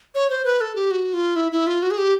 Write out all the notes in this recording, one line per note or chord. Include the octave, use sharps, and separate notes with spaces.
C#5
C5
B4
A4
G4
F#4
F4
E4
E4
F4
F#4
G#4
G4